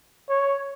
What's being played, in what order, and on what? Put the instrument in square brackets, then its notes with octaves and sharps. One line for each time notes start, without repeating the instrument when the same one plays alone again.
[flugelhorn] C#5